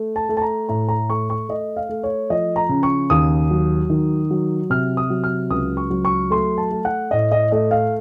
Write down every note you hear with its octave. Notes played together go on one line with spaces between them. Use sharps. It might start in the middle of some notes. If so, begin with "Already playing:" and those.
Already playing: A3
A5
A3
A5
A#5
A2 A#5
A#5
A3 C#6
C#6
A3 D#5
F5
A3
C#5
F3 D#5
A#5
C#3
C#6
D#2 D#6
F#3
D#3
F#3
C3 F6
D#6
F#3
F6
C#2 D#6
C#6
F#3
C#6
A3 C6
A5
A3
F#5
A2 D#5
D#5
A3 D#5
F5